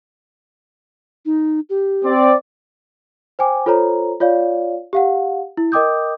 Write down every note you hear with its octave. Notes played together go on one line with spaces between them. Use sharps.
D#4
G4
C4 D5
C5 G5 G#5 D6
F4 A4 C5 C#5 A#5
F4 C#5 D5 F5
G4 F5 F#5
E4
A#4 D#5 G5 D6 D#6 G6